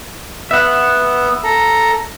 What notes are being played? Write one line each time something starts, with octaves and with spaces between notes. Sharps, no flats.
B3 E5 F#5
A4 A#5